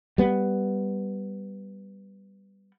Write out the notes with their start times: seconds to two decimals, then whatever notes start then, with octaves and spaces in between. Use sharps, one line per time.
0.18 G3 B3